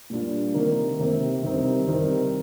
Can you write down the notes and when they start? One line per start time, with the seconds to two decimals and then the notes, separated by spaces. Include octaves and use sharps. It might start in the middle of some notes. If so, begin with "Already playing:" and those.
0.10 A#2 G3 D4 F4
0.54 C3 D#3 A#3
0.99 C3 D#3 A#3
1.43 C3 D#3 G3 C4 D#4
1.87 C3 D#3 G3 C4 D#4